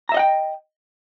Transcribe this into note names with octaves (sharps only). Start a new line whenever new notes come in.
D#5 E5 F#5 G5 A#5